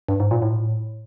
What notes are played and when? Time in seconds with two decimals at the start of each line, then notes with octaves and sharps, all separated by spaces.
0.09 G2
0.20 G#2
0.31 A#2
0.42 A2